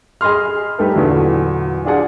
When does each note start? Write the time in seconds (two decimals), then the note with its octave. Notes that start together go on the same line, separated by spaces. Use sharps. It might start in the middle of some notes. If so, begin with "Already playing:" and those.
0.21 G#4 D#5 B5 C6 F6
0.79 G3 A3 D#4 G4 A4 B4
0.95 E2 A#2 D3 F#3
1.85 D4 F4 G#4 D5 F#5 G#5